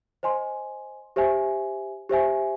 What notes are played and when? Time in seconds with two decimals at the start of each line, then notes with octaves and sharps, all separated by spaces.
0.23 C5 D#5 G#5 C6
1.16 G4 C5 E5 G#5
2.09 G4 C5 E5 G#5